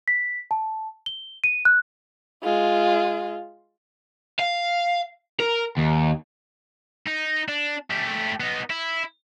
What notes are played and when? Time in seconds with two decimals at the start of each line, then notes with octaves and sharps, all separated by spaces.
0.08 B6
0.51 A5
1.06 G7
1.44 D#7
1.65 F#6
2.44 G#3 F4
4.39 F5
5.40 A#4
5.77 D#2
7.08 D#4
7.48 D4
7.90 A3 G4
8.40 B3 D#4
8.70 E4